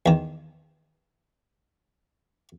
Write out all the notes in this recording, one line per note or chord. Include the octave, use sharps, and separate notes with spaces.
E2 D#3